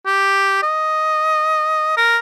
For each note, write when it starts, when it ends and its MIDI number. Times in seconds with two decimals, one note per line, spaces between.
0.06 0.61 67
0.63 1.94 75
1.97 2.19 70